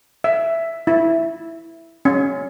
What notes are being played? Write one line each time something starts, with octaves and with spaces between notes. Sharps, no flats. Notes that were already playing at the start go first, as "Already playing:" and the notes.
E5
E4
C#4